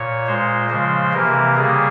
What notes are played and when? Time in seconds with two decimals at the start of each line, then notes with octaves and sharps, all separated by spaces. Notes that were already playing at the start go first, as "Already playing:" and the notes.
Already playing: A#2 C#5
0.27 A#2 G#3 C5
0.70 C#3 F3 G#3 C5
1.13 C3 E3 A#3 A#4
1.56 C#3 G3 A#3 G#4